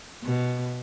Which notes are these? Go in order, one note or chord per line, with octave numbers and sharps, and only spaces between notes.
B2